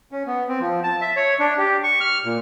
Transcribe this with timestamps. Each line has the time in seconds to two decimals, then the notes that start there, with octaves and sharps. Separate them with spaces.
0.12 C#4
0.27 B3
0.48 C4
0.60 F3
0.84 A5
1.01 E5
1.16 C#5
1.40 D4
1.58 G4
1.83 C#6
2.01 F6
2.24 A#2